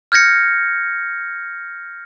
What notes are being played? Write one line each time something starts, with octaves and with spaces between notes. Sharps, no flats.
F6 G6 G#6 A#6 C#7